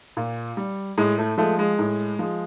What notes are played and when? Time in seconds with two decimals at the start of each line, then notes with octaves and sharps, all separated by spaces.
0.17 A#2
0.57 G3
0.98 A2 G#3
1.19 A3
1.38 F3 G#3 A3
1.59 G#3
1.79 A2
2.19 F3 G#3